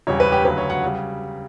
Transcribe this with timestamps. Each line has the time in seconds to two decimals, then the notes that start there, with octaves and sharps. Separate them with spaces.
0.07 E1 E2 C#3 G3 C#5
0.20 B4
0.32 G4
0.45 D2 C#3 F#3 B4
0.58 C#5
0.70 F#5
0.84 C#3 G3